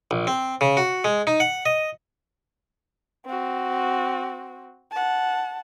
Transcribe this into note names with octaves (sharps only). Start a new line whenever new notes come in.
A#1
C4
C#3
F#4
G#3
D#4
F#5
D#5
C4 F#4
F#5 A5